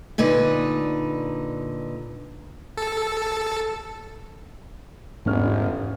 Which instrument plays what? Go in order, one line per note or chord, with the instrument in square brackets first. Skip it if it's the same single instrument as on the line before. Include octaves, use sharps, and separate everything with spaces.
[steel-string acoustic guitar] A#2 D3 D#4 B4
[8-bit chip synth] A4
[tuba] G1 [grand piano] E2 C#4 F6 [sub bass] G#2